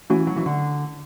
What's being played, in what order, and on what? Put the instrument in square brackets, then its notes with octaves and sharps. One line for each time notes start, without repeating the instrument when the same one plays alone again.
[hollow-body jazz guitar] E3 [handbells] A3 C#4 F#4
[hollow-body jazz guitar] F#3
E3
D3